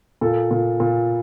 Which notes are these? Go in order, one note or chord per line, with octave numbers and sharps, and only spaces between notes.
A#2 A4
A#2
A#2